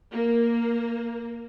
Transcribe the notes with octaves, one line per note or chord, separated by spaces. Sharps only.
A#3